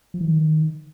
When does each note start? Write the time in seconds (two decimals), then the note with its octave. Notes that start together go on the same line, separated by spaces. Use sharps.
0.14 F3
0.21 E3
0.27 D#3